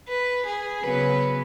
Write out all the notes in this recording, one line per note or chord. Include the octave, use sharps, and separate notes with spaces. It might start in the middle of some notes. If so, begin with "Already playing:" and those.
B4
G#4
C#3 F#3 B3 B4